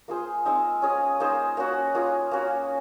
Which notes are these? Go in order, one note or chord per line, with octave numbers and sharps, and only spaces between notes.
A#3 F4 G#4 C5
G#3 C4 D#4
C#4 G#4 D#5
A#3 D#4 G#4 C5
A#3 C#4 F#4
A#3 F4 G#4
A#3 C#4 F#4